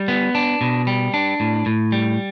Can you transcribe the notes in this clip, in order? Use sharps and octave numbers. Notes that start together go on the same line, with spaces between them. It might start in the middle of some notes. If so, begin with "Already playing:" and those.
Already playing: G3
B3
D4
B2
G3
D4
A2
A2
G3